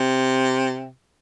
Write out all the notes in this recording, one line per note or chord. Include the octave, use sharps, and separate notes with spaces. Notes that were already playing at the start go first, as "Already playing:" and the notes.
Already playing: C3